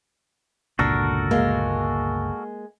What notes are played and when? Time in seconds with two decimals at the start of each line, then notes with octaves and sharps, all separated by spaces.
0.79 G1 C#2 A#2 D4 F#4 A4 A#4
1.31 G#3 A#3